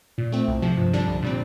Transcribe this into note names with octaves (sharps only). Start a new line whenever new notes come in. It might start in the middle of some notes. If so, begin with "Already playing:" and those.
A#2
A3 C4
C2
C3 F3
G2
D3 G3 D4
C2
A#2 G3 C4